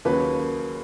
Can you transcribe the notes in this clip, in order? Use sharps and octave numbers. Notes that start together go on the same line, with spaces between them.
D#2 C#3 F#3 A#3 B4